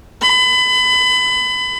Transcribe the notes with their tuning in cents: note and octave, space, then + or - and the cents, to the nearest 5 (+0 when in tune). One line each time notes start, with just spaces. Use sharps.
B5 +30